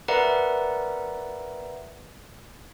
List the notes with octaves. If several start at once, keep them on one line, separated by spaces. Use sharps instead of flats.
A#4 B4 D5 E5 F#5 A#5